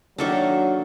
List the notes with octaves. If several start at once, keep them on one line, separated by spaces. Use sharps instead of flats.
D#3 F#3 A#3 D4 F#4 A4 E5